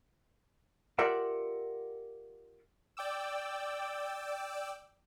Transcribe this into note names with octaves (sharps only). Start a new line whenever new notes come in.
F4 G4 A#4 D5 E5 F#5
D5 G5 D6 E6